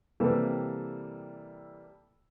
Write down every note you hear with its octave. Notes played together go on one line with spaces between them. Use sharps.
C3 E3 G3 A#3 A4